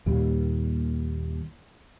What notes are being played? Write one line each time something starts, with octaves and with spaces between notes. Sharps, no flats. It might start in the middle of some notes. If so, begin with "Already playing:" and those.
D#2 A#2 G3